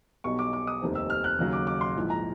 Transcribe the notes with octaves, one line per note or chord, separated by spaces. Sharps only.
B1 B2 G3 C#6
D6
D6
D#6
F1 D#2 D#3 G3 C4
E6
F6
F#6
D#2 C#3 F#3
D6
D6
C6
A#1 G#2 E3
A#5